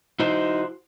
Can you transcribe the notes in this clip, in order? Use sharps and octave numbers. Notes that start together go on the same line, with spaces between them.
D#4 E4 F#4 C5